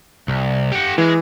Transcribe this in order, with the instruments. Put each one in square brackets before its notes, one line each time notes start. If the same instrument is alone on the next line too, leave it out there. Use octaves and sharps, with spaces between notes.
[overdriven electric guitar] C2
G4 F#5
[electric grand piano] E3 [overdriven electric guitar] G#3